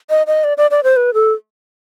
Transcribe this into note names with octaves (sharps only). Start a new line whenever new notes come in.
D#5
D#5
D5
D5
D5
C5
B4
A4